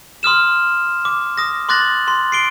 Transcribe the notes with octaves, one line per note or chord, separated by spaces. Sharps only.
C6 D#6 F6 E7
D6
D#6 A#6
C6 D6 F#6 A6 A#6 F#7
C6
C7 D7 G7